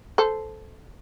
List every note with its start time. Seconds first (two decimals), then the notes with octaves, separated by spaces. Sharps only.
0.18 A4 C5